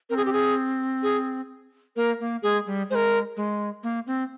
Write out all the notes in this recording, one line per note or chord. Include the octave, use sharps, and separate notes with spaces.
C4 A#4
G#4
G4
G#4
G#4
A#3 A#4
A#3
G#3 G#4
G3
G#3 A#4 C5
G#3
A#3
C4